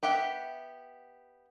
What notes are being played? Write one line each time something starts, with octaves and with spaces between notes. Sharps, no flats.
B3 G4 E5 F#5 G5